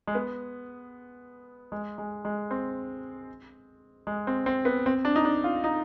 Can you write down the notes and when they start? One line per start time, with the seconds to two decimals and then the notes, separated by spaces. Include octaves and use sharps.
0.07 G#3
0.15 B3
1.72 G#3
1.98 G#3
2.25 G#3
2.51 C4
4.07 G#3
4.27 C4
4.46 C4
4.65 B3
4.86 C4
5.05 D4
5.16 D#4
5.25 D4
5.44 F4
5.64 D#4